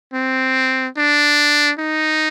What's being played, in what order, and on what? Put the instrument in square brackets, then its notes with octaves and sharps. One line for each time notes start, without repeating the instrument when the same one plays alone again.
[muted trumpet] C4
D4
D#4